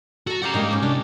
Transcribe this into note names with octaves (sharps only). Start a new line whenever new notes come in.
F#4 A4 A#5
C#3 G4 F5 F#5 A#5
G#2 G3 G#3 A#3 D#4
C#4 G4
C2 D4